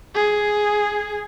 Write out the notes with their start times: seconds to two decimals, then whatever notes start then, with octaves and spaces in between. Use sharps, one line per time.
0.15 G#4